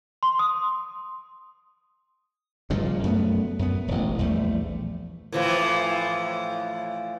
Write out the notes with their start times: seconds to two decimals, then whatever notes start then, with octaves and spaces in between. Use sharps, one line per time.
0.23 C6
0.39 D#6
2.70 F1 G2 A#2 C#3
3.03 F#2 A3 B3
3.59 F#2 B3
3.88 E1 A1
4.19 A#1 E2 G3 A3
5.32 A2 E3 F3